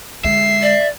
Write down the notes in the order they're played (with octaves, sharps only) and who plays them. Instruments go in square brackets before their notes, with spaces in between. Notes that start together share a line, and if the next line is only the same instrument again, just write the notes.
[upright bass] D3 G#3 [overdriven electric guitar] E5 [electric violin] C7
[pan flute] D5